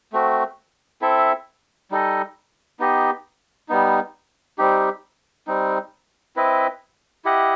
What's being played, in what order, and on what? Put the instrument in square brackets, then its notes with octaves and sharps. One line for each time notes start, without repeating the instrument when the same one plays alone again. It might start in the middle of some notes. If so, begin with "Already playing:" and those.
[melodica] A3 C4 F#4
C4 E4 A4 E5
G3 D#4 A4 D#5
B3 D#4 G4 D#5
G3 B3 D#4
G3 C4 D#4 G4
G3 C4 D#4
C4 E4 B4 D#5
E4 G4 D#5 F#5